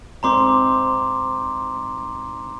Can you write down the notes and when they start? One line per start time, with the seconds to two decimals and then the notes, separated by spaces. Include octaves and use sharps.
0.23 G#2 C4 C5 A#5 C6 D6